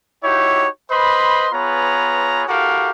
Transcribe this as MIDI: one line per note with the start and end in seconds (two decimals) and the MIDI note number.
0.23 0.67 63
0.23 0.67 64
0.23 0.67 66
0.23 0.67 67
0.23 0.67 73
0.91 1.47 71
0.91 1.47 72
0.91 1.47 75
0.91 1.47 83
0.91 1.47 84
1.53 2.43 59
1.53 2.43 65
1.53 2.43 68
1.53 2.43 71
1.53 2.43 73
1.53 2.43 82
2.47 2.91 64
2.47 2.91 66
2.47 2.91 67
2.47 2.91 69
2.47 2.91 70
2.47 2.91 77